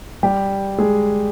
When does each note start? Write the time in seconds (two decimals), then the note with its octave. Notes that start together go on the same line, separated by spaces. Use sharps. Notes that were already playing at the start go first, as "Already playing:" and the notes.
0.23 G3 G4
0.78 G#3 G#4